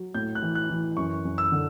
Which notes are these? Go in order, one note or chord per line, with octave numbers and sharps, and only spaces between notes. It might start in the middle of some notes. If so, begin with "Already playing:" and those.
Already playing: F#3
A2 G6
F#6
E3
F#6
E3
F#2 C#6
F#2
E6
D3